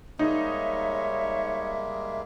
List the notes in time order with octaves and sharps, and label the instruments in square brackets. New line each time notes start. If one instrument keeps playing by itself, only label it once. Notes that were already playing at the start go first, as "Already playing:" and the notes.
[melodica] G3 G#3 A#3 [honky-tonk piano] D#4 [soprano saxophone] C#5 [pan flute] E5